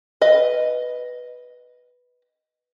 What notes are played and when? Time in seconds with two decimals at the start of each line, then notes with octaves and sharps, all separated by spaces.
0.21 B4 D#5